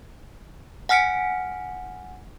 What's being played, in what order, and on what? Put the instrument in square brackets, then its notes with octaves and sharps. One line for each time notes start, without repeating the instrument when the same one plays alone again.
[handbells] F#5 G#5 F6 B6 C#7 D7